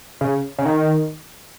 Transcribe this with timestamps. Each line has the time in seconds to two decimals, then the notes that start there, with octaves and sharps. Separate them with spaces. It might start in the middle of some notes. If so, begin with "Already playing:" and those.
0.21 C#3
0.59 C#3
0.65 D#3